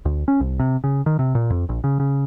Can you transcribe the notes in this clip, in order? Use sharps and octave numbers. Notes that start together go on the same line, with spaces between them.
D2
C#4
C2
C3
C#3
D#3
C3
A#2
F2
A#1
C#3
C#3